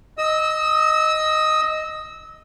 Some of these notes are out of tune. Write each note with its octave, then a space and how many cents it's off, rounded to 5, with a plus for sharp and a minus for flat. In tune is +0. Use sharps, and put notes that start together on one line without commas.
D#5 +0 E6 -25